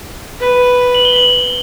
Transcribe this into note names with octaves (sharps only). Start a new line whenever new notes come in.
B4
F#7
G7
F#7